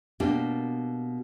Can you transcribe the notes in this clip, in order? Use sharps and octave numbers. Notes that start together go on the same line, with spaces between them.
B2 A#3 D4 G4